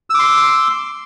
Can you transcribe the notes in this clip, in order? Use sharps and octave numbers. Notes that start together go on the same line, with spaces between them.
C6 D6 E6